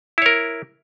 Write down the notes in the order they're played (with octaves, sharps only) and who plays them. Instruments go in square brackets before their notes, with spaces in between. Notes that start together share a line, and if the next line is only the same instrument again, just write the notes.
[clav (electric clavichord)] E4
C#5
A#4